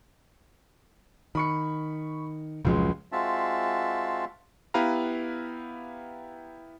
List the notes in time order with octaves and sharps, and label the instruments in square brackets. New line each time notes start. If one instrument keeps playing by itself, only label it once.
[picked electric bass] D#3 [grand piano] B5 C#6 C#7
[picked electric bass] F1 F3 F#3 [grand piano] C#2 G#3
[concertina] G#3 C4 F4 F#4 E5 A5
[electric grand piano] B3 E4 G4 B4 F5 A#5